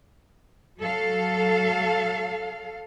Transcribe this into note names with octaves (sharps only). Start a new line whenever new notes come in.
F#3 A4 F5